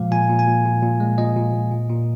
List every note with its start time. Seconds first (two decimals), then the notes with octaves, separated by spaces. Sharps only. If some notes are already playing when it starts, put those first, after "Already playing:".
Already playing: A#2 F3 G#3 F5
0.11 A#2 G#5
0.29 A#2
0.39 G#5
0.48 A#2
0.65 A#2
0.82 A#2
1.00 G#3
1.18 A#2 D#5
1.36 A#2
1.54 A#2
1.71 A#2
1.89 A#2